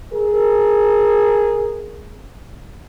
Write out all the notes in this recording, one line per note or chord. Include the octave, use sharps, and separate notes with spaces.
G#4 A#4